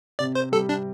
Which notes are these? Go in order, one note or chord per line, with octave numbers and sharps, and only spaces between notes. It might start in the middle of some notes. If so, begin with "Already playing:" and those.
C3 D5
C5
G3 A4
D4